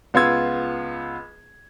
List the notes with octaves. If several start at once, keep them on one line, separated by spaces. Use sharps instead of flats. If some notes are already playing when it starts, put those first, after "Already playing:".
C#2 B3 F4 C6 E6 G#6